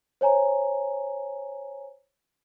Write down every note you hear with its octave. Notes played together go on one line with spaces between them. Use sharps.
C5 C#5 G#5 A#5